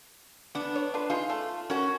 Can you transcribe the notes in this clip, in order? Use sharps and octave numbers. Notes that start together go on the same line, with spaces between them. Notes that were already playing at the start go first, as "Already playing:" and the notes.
B3 D4
C#5
D4 F4 B4
D#4 F4 G#4 C6
A3
C#4 F#4 A#4